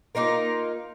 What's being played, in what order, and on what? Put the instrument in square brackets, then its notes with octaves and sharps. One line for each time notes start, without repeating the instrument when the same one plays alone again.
[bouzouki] A#3 D#4 F4 A#4